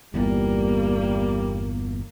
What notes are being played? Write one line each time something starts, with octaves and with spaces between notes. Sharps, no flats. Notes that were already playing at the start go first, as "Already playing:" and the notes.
G1 E2 A#2 G3 A#3